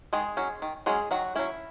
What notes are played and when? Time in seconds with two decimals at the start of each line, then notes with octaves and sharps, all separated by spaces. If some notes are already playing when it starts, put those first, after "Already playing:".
0.13 D#3 G#3 G#4
0.37 F#3 C#4
0.62 D#3
0.86 F#3 G#3 C#4 G#4
1.11 D#3 F#3 F#4
1.36 F#3 C#4 E4